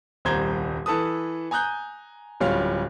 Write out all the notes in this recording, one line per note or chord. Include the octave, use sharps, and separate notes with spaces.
D#1 C2 C5 A#5 G#6 G7
E3 A4 B4 A5 D#6
G#5 A#5 D#6 F#6 G6
D1 G3 C#4 F4 F5